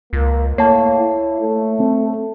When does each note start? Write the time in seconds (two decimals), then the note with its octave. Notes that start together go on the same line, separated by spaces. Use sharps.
0.13 C#2 A#3
0.58 A2 A#3 C#5 A5
0.99 E4
1.41 A3
1.80 C4